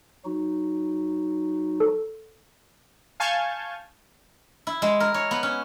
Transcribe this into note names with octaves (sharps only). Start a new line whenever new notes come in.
F#3 D#4 F#4
A4
F5 G#5 A5 C#6 G6
E4
G#3
A#4
C#5
B3
C#4